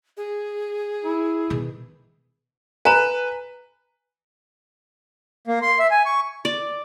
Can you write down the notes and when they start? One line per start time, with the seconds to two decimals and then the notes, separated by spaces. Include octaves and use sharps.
0.17 G#4
1.05 E4
1.50 B2 D#3
2.85 B4 G#5 A#5
5.47 A#3
5.62 C6
5.79 E5
5.91 G#5
6.06 C#6
6.45 D5